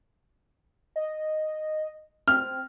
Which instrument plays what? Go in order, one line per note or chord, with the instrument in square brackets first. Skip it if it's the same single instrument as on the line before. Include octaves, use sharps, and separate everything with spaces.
[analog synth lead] D#5
[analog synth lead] C4 [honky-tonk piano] F6